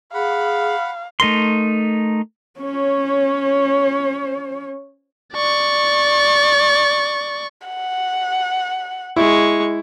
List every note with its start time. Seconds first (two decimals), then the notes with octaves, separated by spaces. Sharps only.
0.14 G#4 F5 F#5 B5
1.20 A3 D#4 A#4 C6
2.60 C#4 C#5
5.33 D5 C#6
7.68 F#5
9.16 G#3 E4 C#6